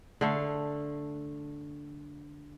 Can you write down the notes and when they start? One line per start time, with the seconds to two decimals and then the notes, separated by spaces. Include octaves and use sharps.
0.21 D3 A3 F5